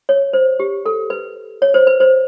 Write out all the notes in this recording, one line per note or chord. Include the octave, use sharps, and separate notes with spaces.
C#5
C5
G4
A4
B4
C#5
C5
B4
C5